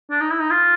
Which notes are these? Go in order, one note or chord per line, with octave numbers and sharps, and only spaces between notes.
D4
D#4
E4
D#4
F4